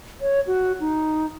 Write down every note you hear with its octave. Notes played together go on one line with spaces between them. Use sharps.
C#5
F#4
D#4